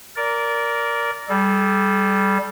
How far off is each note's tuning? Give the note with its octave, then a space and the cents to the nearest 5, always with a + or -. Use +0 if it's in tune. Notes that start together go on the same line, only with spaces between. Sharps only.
A#4 +0 D5 -20
G3 +0 A4 -40